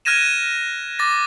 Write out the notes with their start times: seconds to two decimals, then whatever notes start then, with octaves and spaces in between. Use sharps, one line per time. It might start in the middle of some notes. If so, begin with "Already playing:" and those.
0.05 F6 F#6 G#6 A#6 D#7 E7
0.99 D6 A6 A#6